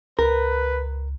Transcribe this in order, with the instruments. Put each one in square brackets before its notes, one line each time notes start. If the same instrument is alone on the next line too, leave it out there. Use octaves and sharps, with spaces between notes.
[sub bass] C#2 [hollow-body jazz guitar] A#4 [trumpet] B4